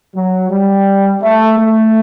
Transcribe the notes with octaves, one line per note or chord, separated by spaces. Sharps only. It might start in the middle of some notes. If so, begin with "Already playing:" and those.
F#3
G3
A3
A3